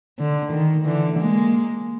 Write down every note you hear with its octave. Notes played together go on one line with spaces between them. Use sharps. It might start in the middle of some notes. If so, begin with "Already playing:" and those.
D3
D#3
D3 E3
G#3 A#3